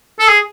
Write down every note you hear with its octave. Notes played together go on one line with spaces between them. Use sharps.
A4
G#4